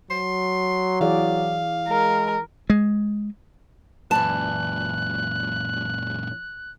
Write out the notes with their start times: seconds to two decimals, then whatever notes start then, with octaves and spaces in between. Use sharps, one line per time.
0.11 F#3 C6
1.01 E3 G#4 D5 F5
1.88 G#3 A#4
2.70 G#3
4.11 F#2 A#2 E3 D5 A5 F#6